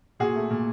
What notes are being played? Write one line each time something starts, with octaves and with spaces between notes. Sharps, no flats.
A#2 F#4 G#4
A3
A#2